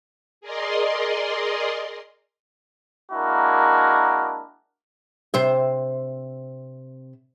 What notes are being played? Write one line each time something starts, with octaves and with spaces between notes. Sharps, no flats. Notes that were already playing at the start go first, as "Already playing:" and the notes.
G#4 A#4 D5 D#5 C6
G#3 A#3 D4 E4 F#4 A#4
C3 C5 E5